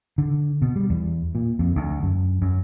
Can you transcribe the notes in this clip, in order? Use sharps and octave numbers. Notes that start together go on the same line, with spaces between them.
D3
B2
G3
E2
A#2
F2
D2
F#2
F#2